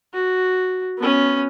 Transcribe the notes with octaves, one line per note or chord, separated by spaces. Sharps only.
F#4
B3 C#4